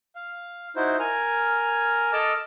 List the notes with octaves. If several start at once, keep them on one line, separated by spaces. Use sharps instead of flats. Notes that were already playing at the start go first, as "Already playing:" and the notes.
F5
D#4 E4 F#4 C5
A#4 G#5 F6
A4 D#5 A5 D6 E6 F6